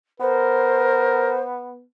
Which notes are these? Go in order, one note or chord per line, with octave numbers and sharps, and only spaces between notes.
B3 A#4 C5